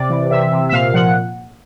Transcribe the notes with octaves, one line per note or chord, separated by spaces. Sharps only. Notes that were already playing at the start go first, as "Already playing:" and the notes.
Already playing: C3 D5
E3
C3 E5
C3
E5
A#2 F5
F3 F#5